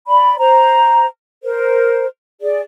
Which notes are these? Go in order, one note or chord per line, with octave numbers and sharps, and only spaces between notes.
D5 B5
C5 A#5
A#4 C5
G#4 D5